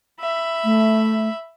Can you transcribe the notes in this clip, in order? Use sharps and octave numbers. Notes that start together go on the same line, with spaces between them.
E5 B5
A3